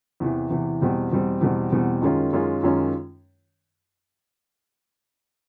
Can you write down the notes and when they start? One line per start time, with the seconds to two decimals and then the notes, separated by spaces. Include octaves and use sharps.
0.20 E2 C3 E3
0.50 E2 C3 E3
0.81 E2 B2 G3 C4
1.11 E2 B2 G3 C4
1.41 E2 B2 G3 C4
1.72 E2 B2 G3 C4
2.02 F#2 D#3 G#3 C#4 F4
2.33 F#2 D#3 G#3 C#4 F4
2.63 F#2 D#3 G#3 C#4 F4